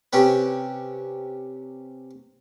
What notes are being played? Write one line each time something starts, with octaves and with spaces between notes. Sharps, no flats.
C3 C#4 G4 B4